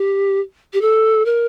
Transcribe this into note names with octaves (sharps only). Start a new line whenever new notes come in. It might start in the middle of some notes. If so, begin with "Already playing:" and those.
Already playing: G4
G4
A4
A#4